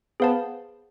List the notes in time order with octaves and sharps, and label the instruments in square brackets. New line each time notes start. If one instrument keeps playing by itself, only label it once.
[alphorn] B3 [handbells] G#4 C5 F5 A5